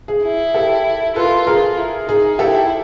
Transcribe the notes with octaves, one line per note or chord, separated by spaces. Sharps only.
G#4
E4
G4 A4
F4 A4 B4
F4 G#4 A#4
E4
D#4 G#4
E4 G4 A4